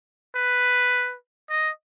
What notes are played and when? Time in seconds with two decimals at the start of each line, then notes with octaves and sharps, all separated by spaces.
0.35 B4
1.50 D#5